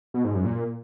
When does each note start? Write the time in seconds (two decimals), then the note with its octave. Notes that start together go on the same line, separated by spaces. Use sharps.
0.14 B2
0.24 G#2
0.35 F#2
0.45 A#2